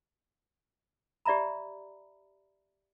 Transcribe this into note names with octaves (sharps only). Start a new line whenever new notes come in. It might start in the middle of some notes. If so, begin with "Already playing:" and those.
G4 D5 E5 A#5 B5